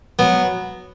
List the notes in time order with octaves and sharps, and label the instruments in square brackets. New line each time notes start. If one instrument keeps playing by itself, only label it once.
[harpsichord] F#3 B3